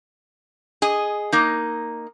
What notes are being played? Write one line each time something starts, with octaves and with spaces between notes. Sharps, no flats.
G#4 D#5
A#3 D#4